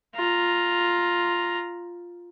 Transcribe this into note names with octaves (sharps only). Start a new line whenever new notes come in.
F4 A#5